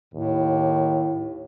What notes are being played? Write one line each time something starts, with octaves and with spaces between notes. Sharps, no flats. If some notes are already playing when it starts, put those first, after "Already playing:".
D#2 A2